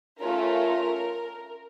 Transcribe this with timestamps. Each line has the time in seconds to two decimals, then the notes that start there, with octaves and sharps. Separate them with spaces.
0.19 A3 C#4 F4 A#4